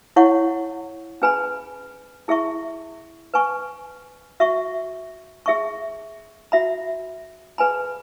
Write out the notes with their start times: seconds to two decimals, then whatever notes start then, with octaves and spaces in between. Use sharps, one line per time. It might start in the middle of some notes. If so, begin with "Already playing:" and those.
0.16 E4 C#5 F#5 C#6
1.22 C#4 G#4 B4 G#5 B5
2.28 E4 G#4 E5 C#6
3.34 B4 G#5 C#6
4.40 F#4 E5 C#6
5.46 G#4 E5 C#6
6.52 F#4 E5 B5
7.58 G#4 B4 G#5 B5